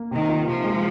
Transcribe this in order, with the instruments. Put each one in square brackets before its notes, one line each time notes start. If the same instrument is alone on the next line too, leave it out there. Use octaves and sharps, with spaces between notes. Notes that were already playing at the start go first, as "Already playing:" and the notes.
Already playing: [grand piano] A#3
[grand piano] C3 [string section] D#3
[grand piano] F4
[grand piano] C3 [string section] F3
[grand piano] G#3